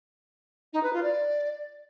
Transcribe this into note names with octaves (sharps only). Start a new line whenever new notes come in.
D#4
B4
F4
D5